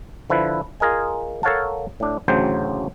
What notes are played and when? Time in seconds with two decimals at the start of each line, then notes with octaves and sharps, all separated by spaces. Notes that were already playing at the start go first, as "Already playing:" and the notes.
0.30 D3 F3 E4 B4
0.80 F4 G#4 A#4 D#5 G#5
1.43 A4 A#4 C#5 F5 F#5 A5
2.00 A2 D4
2.28 A1 D2 C#3 F#3 C5 G5